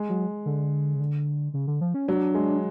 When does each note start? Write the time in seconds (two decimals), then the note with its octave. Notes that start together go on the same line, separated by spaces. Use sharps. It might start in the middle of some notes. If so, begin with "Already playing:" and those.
Already playing: G#3
0.09 F#3
0.46 D3
0.95 C#3
1.00 D3
1.54 C#3
1.67 D3
1.81 F3
1.94 C#4
2.08 F#3 D4
2.34 G#3